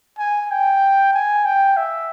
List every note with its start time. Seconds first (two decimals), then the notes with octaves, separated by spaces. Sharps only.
0.18 G#5
0.51 G5
1.13 G#5
1.45 G5
1.77 E5